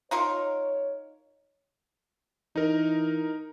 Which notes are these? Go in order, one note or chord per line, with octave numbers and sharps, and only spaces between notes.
D#4 F4 A#4 C#5
E3 D#4 A#4